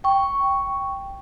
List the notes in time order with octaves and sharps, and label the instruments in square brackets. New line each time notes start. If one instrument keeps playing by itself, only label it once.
[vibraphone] G5 C#6